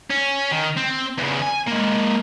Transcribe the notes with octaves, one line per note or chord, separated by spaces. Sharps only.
C#4
D#3
C4
E2 C#3
G#5
G#3 A#3